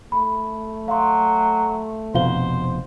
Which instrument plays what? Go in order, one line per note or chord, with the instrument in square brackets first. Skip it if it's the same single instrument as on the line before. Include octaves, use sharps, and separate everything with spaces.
[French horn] A3 [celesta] B5
[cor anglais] F#3 [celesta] F5 C6
[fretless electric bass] F1 B2 [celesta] F4 F5 G7 [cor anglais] C5